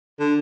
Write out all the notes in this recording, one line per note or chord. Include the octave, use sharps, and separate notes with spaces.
D3